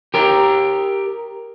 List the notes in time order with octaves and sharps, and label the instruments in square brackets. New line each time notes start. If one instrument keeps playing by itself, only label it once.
[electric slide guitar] G4 A#4